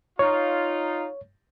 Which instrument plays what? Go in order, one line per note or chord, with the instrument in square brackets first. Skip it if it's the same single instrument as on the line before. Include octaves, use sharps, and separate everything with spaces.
[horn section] D#4 F4 [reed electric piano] C#5